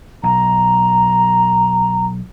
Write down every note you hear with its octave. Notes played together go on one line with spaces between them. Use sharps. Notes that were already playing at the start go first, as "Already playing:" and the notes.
B1 A#5